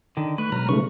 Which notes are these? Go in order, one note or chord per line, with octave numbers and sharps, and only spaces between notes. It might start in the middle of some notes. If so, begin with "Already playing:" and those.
D3 D#3
A3 B4 C#6 F#6
B2 F#3 G#3 A#5 F6 A#6
C#3 G3 A3 C#4 D#4 B4 C#6